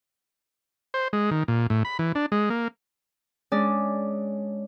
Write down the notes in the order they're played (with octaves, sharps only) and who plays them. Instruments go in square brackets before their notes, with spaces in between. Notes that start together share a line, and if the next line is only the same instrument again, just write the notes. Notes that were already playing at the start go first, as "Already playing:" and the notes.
[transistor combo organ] C5
G#3
D#3
A#2
A2
B5
E3
D4
G#3
A#3
[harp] G#3 C#4 D4 D5